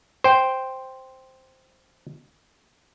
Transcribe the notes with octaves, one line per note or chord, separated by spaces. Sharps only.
C5 G5